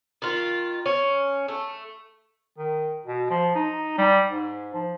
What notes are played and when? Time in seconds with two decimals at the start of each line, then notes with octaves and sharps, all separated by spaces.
0.22 D#3 F4
0.86 C#4
1.48 A3
2.58 D#3
3.06 B2
3.30 F3
3.55 D#4
3.98 G3
4.28 G#2
4.74 F3